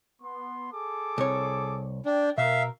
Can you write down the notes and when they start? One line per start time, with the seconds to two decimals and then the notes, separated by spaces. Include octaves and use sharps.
0.22 B3 C6
0.73 G#4 A4 D6
1.18 C2 C#5
2.06 D4 G5
2.38 B2 A#4 E5 F5